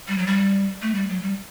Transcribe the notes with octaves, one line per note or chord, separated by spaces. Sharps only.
G3
F#3
G3
A3
G3
F#3
G3